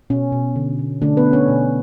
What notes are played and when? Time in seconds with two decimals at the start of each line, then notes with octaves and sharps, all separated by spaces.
0.10 B2 C#4
0.32 B2
0.56 D3
0.79 D3
1.02 D3 A3 D4
1.17 B3 B4
1.25 A3
1.33 C#4 C#5
1.48 B2